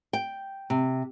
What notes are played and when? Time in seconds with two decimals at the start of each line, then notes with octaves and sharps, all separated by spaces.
0.13 G5
0.70 C3